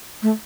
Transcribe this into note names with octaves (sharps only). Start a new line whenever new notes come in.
A3